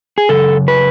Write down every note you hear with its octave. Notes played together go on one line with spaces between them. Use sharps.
G#4
F#2 C#3 A4
B4